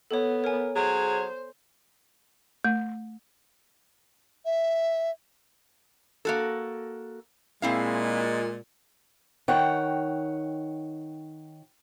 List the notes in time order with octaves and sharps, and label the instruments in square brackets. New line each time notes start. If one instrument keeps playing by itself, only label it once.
[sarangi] B3 [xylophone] A4 C#5
[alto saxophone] A#4 [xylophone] C#5 G#5
[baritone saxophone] F#3 [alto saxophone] G#4 [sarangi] C5
[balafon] A3
[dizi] E5
[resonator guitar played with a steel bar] A#3 F#4 A4
[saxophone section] A#2 G#3 [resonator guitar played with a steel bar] C4 E4 F5
[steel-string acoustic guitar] D#3 C#5 F#5 G5